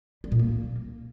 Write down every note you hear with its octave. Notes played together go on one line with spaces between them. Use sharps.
G3
A#2
A#3